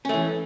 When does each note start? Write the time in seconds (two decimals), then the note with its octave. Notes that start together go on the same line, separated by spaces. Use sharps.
0.05 C#4
0.09 A3
0.14 E3